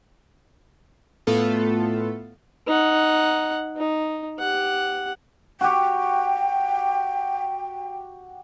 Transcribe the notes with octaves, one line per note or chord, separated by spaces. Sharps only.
A2 A3 B3 F4 A4
D#4 F#5
D#4
G4 F#5
F#4 G4 G5